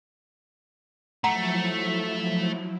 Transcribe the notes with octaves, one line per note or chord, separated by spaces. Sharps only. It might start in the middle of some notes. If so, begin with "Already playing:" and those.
F3 F#3 A3 E4 F#5 A#5